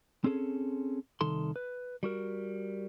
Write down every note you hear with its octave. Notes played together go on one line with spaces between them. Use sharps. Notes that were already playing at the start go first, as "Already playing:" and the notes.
C4 C#4 G#4 A4
C2 D#3 A4 C6
B4
G3 F#4 A#4